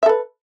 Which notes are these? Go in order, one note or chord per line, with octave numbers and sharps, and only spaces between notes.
A4 B4 E5